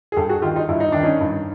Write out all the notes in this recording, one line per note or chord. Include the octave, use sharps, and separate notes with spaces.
G#4
G2 G4 A4
F#4 G#4
D#3 F4 G4
D#4 F4
G2 E4
D#4
D#3 D4
C#4 D#4
G2